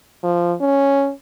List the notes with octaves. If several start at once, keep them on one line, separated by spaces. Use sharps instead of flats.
F3
C#4